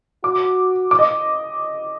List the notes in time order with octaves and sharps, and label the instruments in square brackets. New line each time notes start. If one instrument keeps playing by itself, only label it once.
[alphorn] F#4 [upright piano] D6
[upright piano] D6
D#5